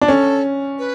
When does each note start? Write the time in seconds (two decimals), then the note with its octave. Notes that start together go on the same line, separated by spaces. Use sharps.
0.01 D4
0.08 C#4 A4
0.79 B4